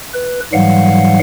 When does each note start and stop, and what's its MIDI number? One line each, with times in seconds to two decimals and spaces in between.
0.14 0.40 71
0.53 1.19 44
0.53 1.19 52
0.53 1.19 54
0.53 1.19 55
0.53 1.19 77
0.53 1.19 78